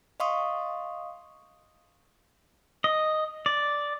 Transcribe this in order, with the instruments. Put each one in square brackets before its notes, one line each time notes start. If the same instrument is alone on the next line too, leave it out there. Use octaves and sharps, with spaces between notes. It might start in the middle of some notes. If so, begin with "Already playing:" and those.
[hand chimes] D#5 F5 C6 C#6 D#6
[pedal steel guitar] D#5
D5